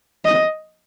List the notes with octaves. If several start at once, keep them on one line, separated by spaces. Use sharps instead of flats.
D#5